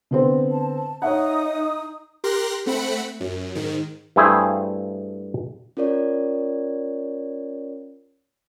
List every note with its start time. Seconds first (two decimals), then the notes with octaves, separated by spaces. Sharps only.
0.11 D3 B3 C4
0.51 A5
1.02 D#4 C#5 E5 F#5 D#6
2.24 G4 A#4 C6 F#6 A#6
2.66 A3 C4 F#5 B5 C#7
3.20 F#2
3.55 G#2 D#3
4.16 G2 A3 E4 G#4 C5
5.77 C#4 F4 A#4 C#5 D5